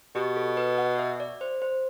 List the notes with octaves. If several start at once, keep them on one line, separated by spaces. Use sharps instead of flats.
B2 G4
A4
B4
F#5
E5
D5
C5
C5